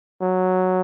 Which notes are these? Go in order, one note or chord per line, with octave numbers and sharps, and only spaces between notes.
F#3